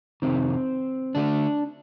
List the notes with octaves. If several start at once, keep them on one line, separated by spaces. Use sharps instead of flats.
F2 C3 D#3 C4
D3 A3 D4